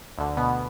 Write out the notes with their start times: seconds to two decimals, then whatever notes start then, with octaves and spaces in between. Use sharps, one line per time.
0.18 D2 D3
0.37 B2 B3